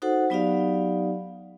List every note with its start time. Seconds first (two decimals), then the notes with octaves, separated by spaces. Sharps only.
0.02 D#4 F#4 A4 C5 F#5
0.30 F#3 B3 D#4 G4 D5 F5